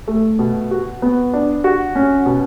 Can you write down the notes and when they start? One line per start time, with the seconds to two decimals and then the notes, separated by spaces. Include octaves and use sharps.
0.08 A3
0.39 B2
0.71 F#4
1.02 B3
1.33 D4
1.64 F#4
1.95 C#4
2.26 B2